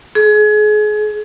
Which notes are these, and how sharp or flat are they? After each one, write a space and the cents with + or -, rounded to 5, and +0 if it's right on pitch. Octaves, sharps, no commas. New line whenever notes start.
G#4 +30